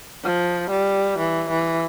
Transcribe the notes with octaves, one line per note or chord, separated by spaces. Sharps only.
F3
G3
E3
E3